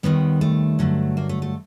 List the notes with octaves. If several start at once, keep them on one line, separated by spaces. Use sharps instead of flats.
D#2 D#3 G3 B3
A3
G2 D3 F#3
A#3
A3
A3